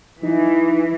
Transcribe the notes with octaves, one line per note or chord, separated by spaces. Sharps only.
E3 D#4